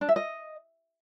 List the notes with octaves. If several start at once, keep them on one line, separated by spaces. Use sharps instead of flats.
D4
E5
D#5